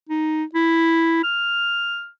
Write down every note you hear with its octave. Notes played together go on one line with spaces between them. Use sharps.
D#4
E4
F6